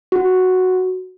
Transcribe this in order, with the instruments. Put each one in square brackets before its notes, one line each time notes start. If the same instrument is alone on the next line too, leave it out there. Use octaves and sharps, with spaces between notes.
[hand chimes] F#4